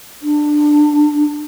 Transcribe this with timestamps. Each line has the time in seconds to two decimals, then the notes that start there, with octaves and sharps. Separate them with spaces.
0.22 D4